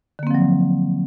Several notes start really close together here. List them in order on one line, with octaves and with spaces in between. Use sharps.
D3 A#3 C4 F3 F#3